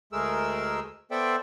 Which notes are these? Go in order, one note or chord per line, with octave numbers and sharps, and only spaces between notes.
D2 G#3 A3 G#4 A#4 E6
B3 A4 C5 D5 E5 G5